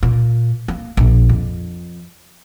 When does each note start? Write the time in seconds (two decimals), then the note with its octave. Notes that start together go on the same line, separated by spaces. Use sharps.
0.03 A#2
0.68 A#3
0.97 A#1
1.29 F2